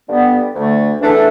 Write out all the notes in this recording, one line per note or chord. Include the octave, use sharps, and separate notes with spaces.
G2 D3 G3 B3
D2 D3 A3
E2 E3 A3 D4
D4